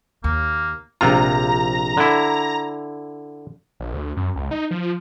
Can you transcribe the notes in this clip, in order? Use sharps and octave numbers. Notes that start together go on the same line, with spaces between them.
D#2 A#3
A#1 C3 F4 A#5
D3 E4
A#1
D2
F#2
C#2
D#4
F3